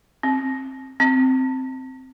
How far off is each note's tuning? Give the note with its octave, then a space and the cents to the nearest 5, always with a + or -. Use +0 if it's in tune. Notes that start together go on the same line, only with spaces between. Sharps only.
C4 +20
C4 -5